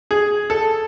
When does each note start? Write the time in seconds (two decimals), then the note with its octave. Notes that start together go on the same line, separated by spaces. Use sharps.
0.11 G#4
0.50 A4